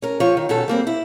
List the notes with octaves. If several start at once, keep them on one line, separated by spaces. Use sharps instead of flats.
C#4 A#4
F3 C#5
D#3
B2 D#3 C#4 A4
G3 A#3 C4
E4